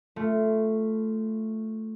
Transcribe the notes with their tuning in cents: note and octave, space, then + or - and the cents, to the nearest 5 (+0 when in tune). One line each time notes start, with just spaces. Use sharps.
A3 +0 F4 -5